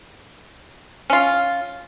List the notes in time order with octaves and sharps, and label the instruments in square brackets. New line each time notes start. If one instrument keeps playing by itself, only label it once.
[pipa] C#4 F4